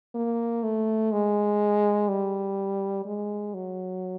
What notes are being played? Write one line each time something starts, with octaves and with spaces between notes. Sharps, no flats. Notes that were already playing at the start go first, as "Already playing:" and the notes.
A#3
A3
G#3
G3
G#3
F#3